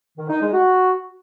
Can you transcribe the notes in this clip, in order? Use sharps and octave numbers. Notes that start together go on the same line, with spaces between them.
D#3
D#4
G#3
F#4